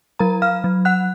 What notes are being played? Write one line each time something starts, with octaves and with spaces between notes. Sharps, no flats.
F#3 A#4 A#5
F5 F6
F#3
F#5 F#6